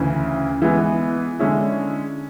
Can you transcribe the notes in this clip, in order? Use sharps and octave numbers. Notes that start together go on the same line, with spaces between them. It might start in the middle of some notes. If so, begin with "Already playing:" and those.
Already playing: D2 C#3 E3
E3 G#3 B3
D3 G#3 C#4 E4